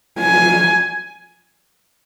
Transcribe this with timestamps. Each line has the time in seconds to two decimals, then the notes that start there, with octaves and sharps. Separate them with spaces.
0.20 G#5